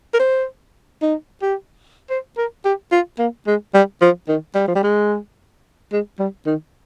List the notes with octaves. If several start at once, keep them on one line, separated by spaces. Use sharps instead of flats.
A#4
C5
D#4
G4
C5
A#4
G4
F4
A#3
G#3
G3
F3
D#3
G3
F3
G3
G#3
G#3
G3
D#3